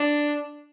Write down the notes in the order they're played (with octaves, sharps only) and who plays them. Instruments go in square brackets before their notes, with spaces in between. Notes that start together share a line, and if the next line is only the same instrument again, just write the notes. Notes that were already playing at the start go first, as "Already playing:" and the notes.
Already playing: [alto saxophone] D4